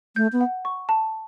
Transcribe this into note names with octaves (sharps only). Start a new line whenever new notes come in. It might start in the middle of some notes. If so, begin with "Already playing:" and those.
A3 G6
B3
F#5
C#6
A5